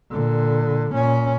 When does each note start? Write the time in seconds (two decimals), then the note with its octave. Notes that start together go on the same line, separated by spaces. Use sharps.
0.11 A#2 D3
0.91 A#2 C#4